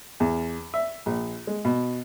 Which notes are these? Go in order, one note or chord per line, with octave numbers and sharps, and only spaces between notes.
E2
E5
A#1
G#3
B2